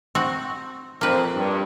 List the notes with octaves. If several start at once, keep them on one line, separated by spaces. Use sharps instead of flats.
C4 F#4
F2 A#3 C4 B4
G2